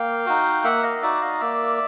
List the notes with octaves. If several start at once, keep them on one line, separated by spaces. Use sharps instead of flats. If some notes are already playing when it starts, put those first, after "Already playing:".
Already playing: A#3 F5 G5
D#4 F#4
A#3 E5 F#5
D#5 F5
D#4 F#4 D5 E5
D#5 F5
A#3 D5 E5